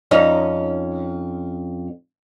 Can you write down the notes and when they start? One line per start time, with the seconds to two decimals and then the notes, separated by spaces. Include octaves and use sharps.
0.11 F2 C#4 D#4